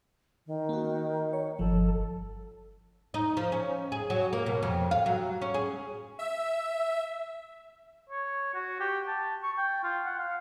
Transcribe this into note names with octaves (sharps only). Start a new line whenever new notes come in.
D#3
A#3 F#4
C#5
G1 F3 A4
D#4
F3
C#4
G#4
F#3
A#3
B2
F2
F5
F#3
C#4
G#4
E5
C#5
F#4
G4
A5
C#6
G5
F4
F#5
F5